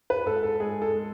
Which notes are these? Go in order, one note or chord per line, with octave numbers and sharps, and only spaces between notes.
B4
G#2 A4
A4
G#3 G#4
A4
G#3